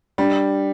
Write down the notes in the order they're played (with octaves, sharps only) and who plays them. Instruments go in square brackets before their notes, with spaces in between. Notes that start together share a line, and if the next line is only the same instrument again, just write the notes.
[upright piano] G3 [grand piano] D4